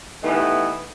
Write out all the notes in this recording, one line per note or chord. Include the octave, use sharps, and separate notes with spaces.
E3 A3 B3 D#4 G4